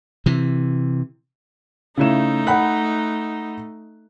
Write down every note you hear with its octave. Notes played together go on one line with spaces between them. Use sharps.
C3 E3
C#3 A3 D#4 E4 E7
F#5 B5 F#6